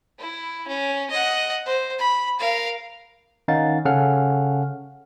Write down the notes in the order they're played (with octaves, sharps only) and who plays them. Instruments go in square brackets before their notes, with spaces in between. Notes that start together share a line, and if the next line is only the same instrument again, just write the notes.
[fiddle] E4
C#4
D#5 F#5
C5
B5
A#4 F5
[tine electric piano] D#3 C#4 D#4 F5 F#5 A6
C#3 C#4 A4 F5 F#5 F6